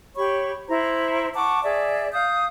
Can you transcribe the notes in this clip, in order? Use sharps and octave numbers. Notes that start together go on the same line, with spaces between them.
G4 C#5 B5 C#6
E4 C5 A#5
F#5 A5 C#6 D6
G#4 D5 E5
F5 D#6 G6